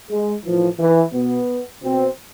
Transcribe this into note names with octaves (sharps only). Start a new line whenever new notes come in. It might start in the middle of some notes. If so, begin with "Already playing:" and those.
G#3
A2 E3 F3
E3
B2 B3
B2 C4